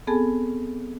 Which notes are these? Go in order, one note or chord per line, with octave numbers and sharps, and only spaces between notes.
B3 C4 G#4 A4 G#5 A5